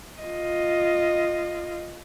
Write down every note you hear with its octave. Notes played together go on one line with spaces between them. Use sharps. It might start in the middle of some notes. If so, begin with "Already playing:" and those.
F4 D#5